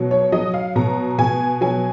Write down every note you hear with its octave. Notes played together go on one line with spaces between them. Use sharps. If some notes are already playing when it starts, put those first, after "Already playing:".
Already playing: B2 F#3
C#5
F#3 D#5
F5
B2 A#5
B2 G#5
F#3 G#5